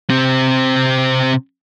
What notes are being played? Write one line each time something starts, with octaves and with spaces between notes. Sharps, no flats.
C3 C4